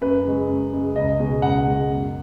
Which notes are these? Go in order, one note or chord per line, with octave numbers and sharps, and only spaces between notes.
F#2 B4
C#3 G#3
F#2
C#3 G#3
C#2 D#5
B2 G#3
C#2 F#5
B2 G#3
F#2